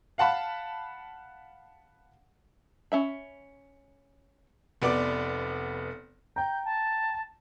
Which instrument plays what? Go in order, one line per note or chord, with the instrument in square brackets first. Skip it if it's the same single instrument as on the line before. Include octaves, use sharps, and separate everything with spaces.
[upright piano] F5 F#5 A5 B5
[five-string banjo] C#4 E5 B5
[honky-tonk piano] F1 B3 D5 D6
[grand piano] G5 A#5 [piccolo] G6
[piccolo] A5